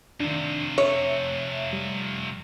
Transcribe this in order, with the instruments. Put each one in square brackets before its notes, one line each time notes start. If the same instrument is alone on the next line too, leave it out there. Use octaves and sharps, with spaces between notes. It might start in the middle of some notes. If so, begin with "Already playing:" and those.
[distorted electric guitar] F2 C3 [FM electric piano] D#3 D4
[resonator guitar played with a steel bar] C#5 [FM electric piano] E5
[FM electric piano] G3